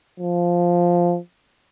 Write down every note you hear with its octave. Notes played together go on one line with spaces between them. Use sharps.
F3